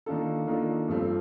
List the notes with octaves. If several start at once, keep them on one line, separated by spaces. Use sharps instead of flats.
D#3 A#3 D4 F4 A4
D#3 A#3 D4 F4 A4
G2 F3 A3 C4